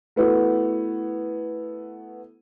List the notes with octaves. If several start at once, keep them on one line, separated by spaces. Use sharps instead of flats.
A3 B3 E4 F#4